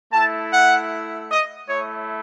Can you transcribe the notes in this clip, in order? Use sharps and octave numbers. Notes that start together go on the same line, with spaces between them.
A3 E4 A5
F#5
D#5
A3 E4 C#5